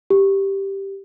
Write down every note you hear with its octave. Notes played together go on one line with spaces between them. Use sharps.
G4